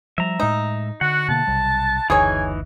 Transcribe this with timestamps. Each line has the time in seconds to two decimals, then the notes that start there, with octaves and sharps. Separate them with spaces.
0.18 F3 G3 E5 A#5
0.40 A2 G#3 D#4
1.01 D3 F#4 F#5
1.28 B2 D3 A#3 A5
1.47 B1 C3 G3
2.10 F#1 D2 E3 D#4 G#4 C#5 G#5